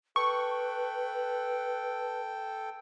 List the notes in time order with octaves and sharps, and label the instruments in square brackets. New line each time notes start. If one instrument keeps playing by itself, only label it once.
[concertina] A4 G5 [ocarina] B4 [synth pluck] C#6